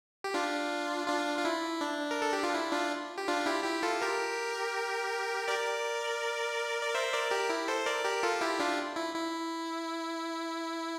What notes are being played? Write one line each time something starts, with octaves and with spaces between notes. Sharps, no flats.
G4
D4 F4
D4 F4
F4
E4
D4
A#4
A4
G4
F4
E4
D4 F4
G4
D4 F4
E4 G4
E4 G4
F4 A4
G4 A#4
A#4 D5
D5
C5 E5
A#4 D5
G4 A#4
E4
A4 C5
A#4 D5
G4 A#4
F4 A4
E4 G4
D4 F4
E4
E4